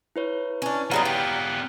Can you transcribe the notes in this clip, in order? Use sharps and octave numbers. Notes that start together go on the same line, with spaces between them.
E4 B4 C#5
C#4 D4
F#3 G3 B3 D#4 F4
G4